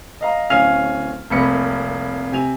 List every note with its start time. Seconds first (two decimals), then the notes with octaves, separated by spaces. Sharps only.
0.21 D#5 F5 A#5
0.50 D1 C#4 F5 G#5 F6 F7
1.30 F1 C2 A#3 B5 C#7
2.32 C3 G#5 F7